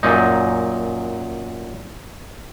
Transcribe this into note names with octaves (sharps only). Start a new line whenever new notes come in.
F#2 A#2 D#4